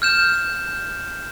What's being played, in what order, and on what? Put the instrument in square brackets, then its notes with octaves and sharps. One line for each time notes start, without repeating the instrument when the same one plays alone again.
[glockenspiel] F6 G6 E7